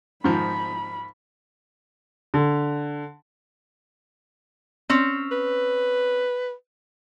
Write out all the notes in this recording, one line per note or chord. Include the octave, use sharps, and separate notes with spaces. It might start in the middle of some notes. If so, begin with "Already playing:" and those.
G#2 D#3 F3 B5
D3
C4 C#4
B4